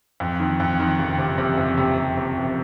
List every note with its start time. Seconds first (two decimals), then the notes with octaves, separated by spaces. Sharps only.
0.20 F2
0.40 D#3
0.60 F2
0.79 D#3
0.99 F#1
1.18 C3
1.38 C3
1.58 F2
1.78 C3
1.98 C3
2.17 C3
2.38 F#1